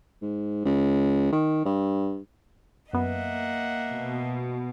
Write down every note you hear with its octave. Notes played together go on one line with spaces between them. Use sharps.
G#2
C#2
D#3
G2
F#2 A#3 B3 D#5 E5 F#5
B2